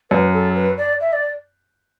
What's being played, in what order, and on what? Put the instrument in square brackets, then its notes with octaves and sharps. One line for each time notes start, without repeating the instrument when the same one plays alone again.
[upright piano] F#2 [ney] B4
[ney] A4
B4
D5
E5
D5